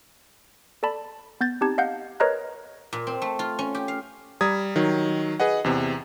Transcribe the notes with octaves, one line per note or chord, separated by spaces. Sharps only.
A4 D5 A5 B5
B3 G6 A6
C4 D#4 G4 A5 G#6
D#5 F5 F#5 G6
A#4 B4 C#5 D#5 A#5 F#6
A#2
C4
A3
F4
C#4
G4
F5
G3 A#5 D#6 G#6
D#3 F#3
G#4 B4 D#5 F#5
E2 C3